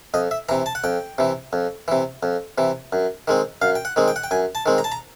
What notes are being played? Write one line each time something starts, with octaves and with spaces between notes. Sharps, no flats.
F2 D#5
E5
C3 E3 A#5
A5
F#5
F2 G5
C3 E3
F2
C3 E3
F2
C3 E3
F#2
D#3 G#3 C4
F#2 F5
G5
F#5
D#3 G#3 C4
G5
F#5
G5
F#2 G#5
A5
D#3 G#3 C4
A#5
A5
A#5